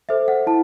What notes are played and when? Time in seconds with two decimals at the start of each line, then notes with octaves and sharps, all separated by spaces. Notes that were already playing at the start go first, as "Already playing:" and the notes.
0.09 A4 C5 E5
0.28 F#5
0.47 E4 A5